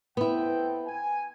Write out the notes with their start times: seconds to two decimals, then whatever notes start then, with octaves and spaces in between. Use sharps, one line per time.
0.17 B3 C4 E4 A4 G5
0.86 G#5